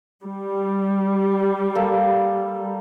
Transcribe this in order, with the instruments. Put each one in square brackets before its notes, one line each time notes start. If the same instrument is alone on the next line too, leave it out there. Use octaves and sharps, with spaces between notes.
[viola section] G3
[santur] A#3 A4